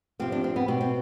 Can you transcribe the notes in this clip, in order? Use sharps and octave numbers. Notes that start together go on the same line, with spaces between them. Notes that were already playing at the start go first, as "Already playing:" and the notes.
C3 F3 C4
D4
C4
B3
B2 C4
C4